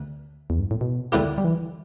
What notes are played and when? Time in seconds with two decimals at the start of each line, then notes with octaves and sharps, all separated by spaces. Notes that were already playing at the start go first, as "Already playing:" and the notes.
Already playing: D2
0.50 E2
0.60 G2
0.71 A2
0.81 B2
1.12 D2 D3 A3 E4 G4
1.38 G3
1.44 E3